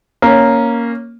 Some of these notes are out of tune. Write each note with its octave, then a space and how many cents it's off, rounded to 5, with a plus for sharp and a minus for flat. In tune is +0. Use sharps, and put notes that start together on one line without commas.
A#3 +0 C#4 +0